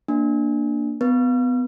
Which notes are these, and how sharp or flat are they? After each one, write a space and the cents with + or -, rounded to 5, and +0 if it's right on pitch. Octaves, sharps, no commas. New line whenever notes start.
A#3 +0 D4 +0
B3 +25 B4 -30